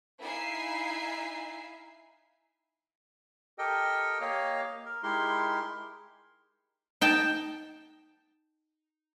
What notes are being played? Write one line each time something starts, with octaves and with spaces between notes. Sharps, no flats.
D#4 E4 E5 F5 G#5 C7
G4 A4 A#4 D#5 G5
A#3 G4 C#5 D#5 F5
A#4
G#3 D#4 E4 G4 A#4 C6
D#4 G5 A5